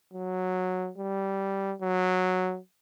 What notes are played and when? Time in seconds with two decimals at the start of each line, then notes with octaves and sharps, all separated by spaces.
0.13 F#3
0.98 G3
1.82 F#3